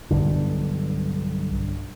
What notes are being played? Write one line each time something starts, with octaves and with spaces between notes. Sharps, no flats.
B1 G2 D3